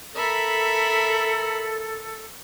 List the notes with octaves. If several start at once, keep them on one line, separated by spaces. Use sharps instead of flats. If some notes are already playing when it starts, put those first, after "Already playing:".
A4 A#4 E5 B5